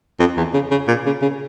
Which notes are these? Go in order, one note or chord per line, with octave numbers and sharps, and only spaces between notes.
F2
E2
C#3
C#3
A#2
C#3
C#3